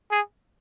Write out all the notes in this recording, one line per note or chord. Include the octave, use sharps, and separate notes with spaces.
G#4